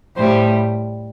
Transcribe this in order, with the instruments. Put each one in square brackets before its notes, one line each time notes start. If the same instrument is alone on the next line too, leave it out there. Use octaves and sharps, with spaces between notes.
[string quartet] A2 G3 C5